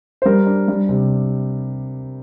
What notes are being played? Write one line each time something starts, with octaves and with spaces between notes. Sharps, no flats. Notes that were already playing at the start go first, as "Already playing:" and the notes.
C5
G3 A#4
D4
G3
C3